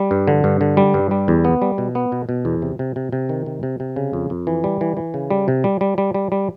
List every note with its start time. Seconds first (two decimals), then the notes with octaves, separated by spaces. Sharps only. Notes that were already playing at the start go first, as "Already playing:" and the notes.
Already playing: G3
0.11 G2
0.28 D3
0.44 G2
0.61 D3
0.77 G3
0.94 G2
1.11 G3
1.28 E2
1.45 B3
1.62 G3
1.78 B2
1.95 B3
2.12 B2
2.29 B2
2.45 E2
2.62 C3
2.79 C3
2.96 C3
3.13 C3
3.29 D#3
3.46 C3
3.63 C3
3.80 C3
3.96 C#3
4.13 F2
4.30 F2
4.47 E3
4.64 G3
4.81 E3
4.97 E3
5.14 C#3
5.31 G3
5.48 C3
5.64 G3
5.81 G3
5.98 G3
6.14 G3
6.32 G3